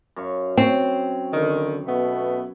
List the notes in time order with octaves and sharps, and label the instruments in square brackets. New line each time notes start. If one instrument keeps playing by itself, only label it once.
[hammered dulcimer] F#2 F5 C#6
[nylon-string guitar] C4 [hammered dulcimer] C#5
[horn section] D3 D#3
B2 A3 B3